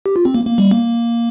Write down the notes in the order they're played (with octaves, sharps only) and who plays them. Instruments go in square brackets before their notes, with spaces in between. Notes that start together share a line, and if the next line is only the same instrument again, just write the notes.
[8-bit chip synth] G4
F4
C4
A#3
A#3
G3
A#3